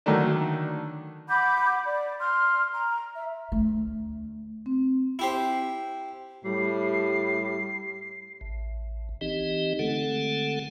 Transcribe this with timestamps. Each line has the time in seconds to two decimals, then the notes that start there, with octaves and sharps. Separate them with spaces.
0.06 D3 D#3 F#3 A3 D4
1.28 F#5 B5 D6 G6
1.85 D5
2.20 C6 F6
2.72 A#5
3.13 E5
3.52 D2 A3
4.66 C4
5.19 E4 G4 C5
6.45 A2 G3 C7
8.41 A1
9.21 E3 C4 D#4 G4 D#5
9.79 D3 G#3 A3 C4 A4 F#5